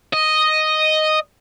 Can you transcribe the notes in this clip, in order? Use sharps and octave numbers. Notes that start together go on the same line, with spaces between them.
D#5